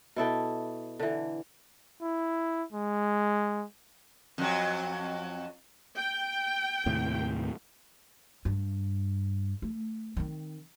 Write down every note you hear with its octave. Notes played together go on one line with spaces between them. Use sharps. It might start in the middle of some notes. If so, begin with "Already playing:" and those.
B2 E4 A4 G5
D3 E3
E4
G#3
F2 F#3
G5
D#2 A2 C3
G2
A3
D#3 C4